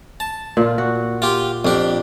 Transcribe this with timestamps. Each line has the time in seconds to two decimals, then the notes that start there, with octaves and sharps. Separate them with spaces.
0.20 A5
0.57 A#2 F4
0.78 F#4
1.22 F4 G4
1.65 F2 D4 G4